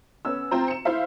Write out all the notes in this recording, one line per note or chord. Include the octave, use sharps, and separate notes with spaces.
B3 C#4 E6
C4 F4 C5 A#5
C#7 E7
E4 C5 E5 F5